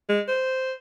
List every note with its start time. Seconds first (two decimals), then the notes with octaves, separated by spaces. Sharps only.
0.09 G#3
0.28 C5